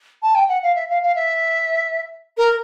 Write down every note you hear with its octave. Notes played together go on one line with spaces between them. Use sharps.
A5
G5
F#5
F5
E5
F5
F5
E5
A#4